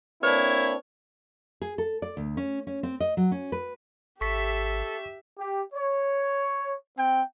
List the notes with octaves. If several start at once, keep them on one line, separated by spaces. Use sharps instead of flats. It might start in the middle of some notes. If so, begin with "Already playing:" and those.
A#3 C4 D4 E4 B4 C#5
G#4
A4
D5
D2
C#4
C#4
C4
D#5
F#3
C#4
B4
G#1 G4 A4 E5 C#6 B6
G4
C#5
C4 G5